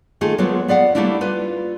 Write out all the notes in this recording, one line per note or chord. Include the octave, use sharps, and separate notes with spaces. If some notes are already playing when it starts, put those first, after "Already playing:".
D#3 A3 F4 G#4
F#3 G#3 A#3 B3 F4
B3 D5 F5 F#5
G3 A3 A#3 D4 E4
F4 B4